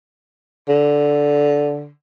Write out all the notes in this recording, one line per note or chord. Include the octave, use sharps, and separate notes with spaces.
D3